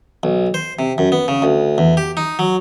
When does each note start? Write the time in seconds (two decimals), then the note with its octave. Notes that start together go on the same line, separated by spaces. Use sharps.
0.23 B1
0.54 C5
0.79 C3
0.98 F#2
1.12 B3
1.28 C#3
1.42 D2
1.78 E2
1.97 G4
2.17 D#4
2.39 F#3